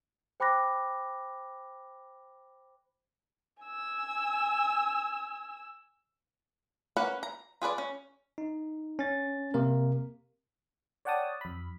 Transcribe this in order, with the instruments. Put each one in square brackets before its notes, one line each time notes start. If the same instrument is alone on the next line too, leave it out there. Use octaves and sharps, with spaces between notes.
[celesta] C5 G5 B5 D6 F#6 A#6
[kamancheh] G#5 E6
[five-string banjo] A#3 C#4 A#4 B4 F#5
A#5
F4 G#4 B4 D5
C#4
[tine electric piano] D#4
C#4 A6
C3 A#3 A#4
[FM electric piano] C#5 D5 F#5 G5 A5 D#6
F2 B5